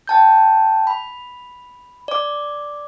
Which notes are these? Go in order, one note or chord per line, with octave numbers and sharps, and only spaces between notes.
G5 A5 G6
B5
D5 D6